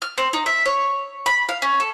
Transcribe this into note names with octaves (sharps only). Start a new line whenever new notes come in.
F6
C4
D#4
E5
C#5
B5
F5
C#4
A4